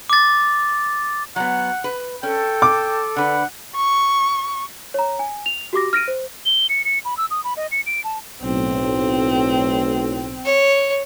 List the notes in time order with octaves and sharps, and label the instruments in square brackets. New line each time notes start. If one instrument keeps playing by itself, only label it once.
[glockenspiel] D6 A6
[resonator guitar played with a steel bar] F#3 B3 [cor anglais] F#5
[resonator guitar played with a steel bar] B4
[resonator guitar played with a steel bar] C#4 [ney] A4 [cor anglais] G5
[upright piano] D6
[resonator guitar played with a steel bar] D3 B4 [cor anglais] F#5
[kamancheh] C#6
[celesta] C#5 A#5
G#5
F7
F#4 G4 D6 A#6
F6 A#6 D7 D#7
C5
[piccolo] G7
C#7
C#7
B5
E6
D#6
B5
D#5
C#7
D7
A5
[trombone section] B1 A2 [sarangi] C4
[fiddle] C#5